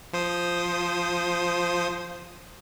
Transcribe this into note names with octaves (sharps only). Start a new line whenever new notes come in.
F3 C5 D#6